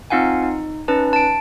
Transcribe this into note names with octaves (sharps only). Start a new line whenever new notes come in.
C4 D#4 F4 F5 F#5 G#5
D#4
C#4 D#4 B4 A5
A5 D7